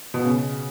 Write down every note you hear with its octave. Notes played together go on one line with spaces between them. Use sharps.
B2
C#3